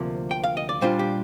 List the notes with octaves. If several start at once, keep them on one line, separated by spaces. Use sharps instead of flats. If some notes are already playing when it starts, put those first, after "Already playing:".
Already playing: D2 C3 F3 A#3
G5
F5
D#5
D5
A#2 G3 D4 F4 C5
G4